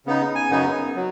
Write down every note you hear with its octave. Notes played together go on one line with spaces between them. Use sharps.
C#3 B3 D#4
G#5
F#2 C#3 B3 D#4
F#3